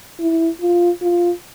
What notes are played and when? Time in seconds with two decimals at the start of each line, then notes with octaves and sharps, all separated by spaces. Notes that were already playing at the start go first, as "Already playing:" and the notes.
0.20 E4
0.61 F4
1.02 F4